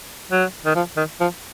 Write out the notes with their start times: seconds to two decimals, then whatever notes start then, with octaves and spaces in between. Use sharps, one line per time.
0.31 F#3
0.65 D#3
0.75 F3
0.97 D#3
1.20 F3